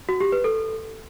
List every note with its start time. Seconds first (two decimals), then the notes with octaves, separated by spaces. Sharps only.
0.09 F#4
0.20 G4
0.32 B4
0.44 A4